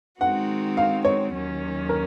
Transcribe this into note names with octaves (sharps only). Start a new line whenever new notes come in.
D#3 G#3 C4 D#4 F#4 F#5
F5
C#5
D#2 D#3 F#3 C#4
A#4